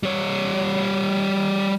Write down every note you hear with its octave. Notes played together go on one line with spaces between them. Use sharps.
G3 C#5